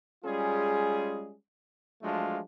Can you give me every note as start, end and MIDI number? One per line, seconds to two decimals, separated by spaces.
0.25 1.34 55
0.25 1.34 56
0.25 1.34 61
0.25 1.34 65
0.25 1.34 68
2.03 2.39 53
2.03 2.39 54
2.03 2.39 56
2.03 2.39 57
2.03 2.39 62
2.03 2.39 65